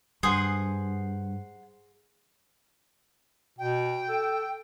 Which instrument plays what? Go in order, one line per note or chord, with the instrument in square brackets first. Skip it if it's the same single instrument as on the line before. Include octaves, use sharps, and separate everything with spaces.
[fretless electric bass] G2 [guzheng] G#4 [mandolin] C5 F#5 D#6
[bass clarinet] B2 [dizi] G5
[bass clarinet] A4